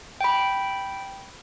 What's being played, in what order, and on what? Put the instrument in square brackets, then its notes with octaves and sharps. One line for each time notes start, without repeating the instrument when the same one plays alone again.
[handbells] G5 B5